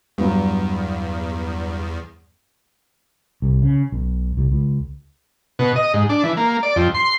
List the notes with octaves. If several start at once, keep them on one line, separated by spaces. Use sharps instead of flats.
E2 G2 F#3
C2
C#3
B1
C2
C#2
B2
D#5
G#2
D4
E3
A#3
D5
F2
C6